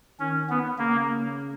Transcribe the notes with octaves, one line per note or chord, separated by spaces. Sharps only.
D#3 C#4
B3
C#3 A#3